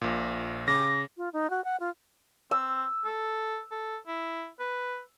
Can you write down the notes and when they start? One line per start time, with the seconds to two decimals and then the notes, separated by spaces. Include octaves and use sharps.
0.01 A#1 A#2
0.68 C#3 D6 A#6
1.17 F4
1.33 D#4
1.50 F#4
1.64 F#5
1.80 F4
2.51 C4 E6
3.05 A4
3.71 A4
4.07 E4
4.60 B4